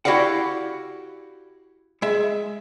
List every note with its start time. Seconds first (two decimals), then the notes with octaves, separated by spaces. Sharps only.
0.05 E4 F#4 G4 D5 F5 F#5
2.02 G#3 E5